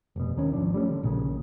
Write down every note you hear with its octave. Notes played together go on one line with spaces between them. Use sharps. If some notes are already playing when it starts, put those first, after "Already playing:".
F1 B2
D#2 D#3 C#4
G#1 F3 D4
G3 A3 C#4
D3
A#1 A#2 C#3